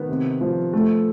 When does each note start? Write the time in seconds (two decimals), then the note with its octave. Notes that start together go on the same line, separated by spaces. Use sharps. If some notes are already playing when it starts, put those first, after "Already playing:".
Already playing: D#3 B3
0.09 C3
0.41 F3
0.73 A3